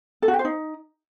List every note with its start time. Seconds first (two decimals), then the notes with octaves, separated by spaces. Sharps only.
0.22 A4
0.28 F#4
0.34 G4
0.39 C5
0.45 D#4